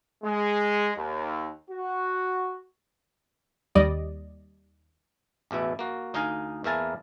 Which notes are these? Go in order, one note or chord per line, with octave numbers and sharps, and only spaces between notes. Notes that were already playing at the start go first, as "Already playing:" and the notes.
G#3
D#2
F#4
D#2 G3 D5 D#5
A1 E2 B2 E4
A#3 F#4
D2 D#4 D#5 F5 G#5
E2 A#3 E4 A#4 G#5 A5